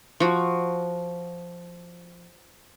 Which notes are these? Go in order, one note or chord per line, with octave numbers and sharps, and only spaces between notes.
F3 F#4